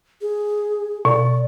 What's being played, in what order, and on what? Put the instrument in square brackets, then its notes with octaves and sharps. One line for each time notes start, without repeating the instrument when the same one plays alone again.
[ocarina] G#4
[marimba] B2 [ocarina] D5